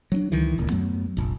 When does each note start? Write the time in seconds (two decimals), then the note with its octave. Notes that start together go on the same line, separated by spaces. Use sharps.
0.12 F#3 C4 D4
0.32 C#2 D#3 E3
0.58 D1 C#2 A#2
0.69 F#2 F#3 A3 B3
1.17 F1 A#1